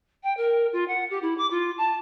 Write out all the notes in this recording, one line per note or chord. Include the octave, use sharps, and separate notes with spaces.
G5
A#4
F4
F#5
G4
E4
D6
F4
A5